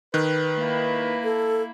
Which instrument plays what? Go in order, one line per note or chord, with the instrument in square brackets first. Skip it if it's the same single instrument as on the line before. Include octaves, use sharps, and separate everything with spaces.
[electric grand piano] D#3 F#6 [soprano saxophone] B4
[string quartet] A#3 E4
[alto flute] A4